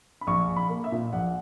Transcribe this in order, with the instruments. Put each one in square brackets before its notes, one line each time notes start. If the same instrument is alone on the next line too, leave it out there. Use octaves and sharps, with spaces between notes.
[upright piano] B5
A#1 C#6
A#1
B5
A#3
E5
A#2
A#1 F#5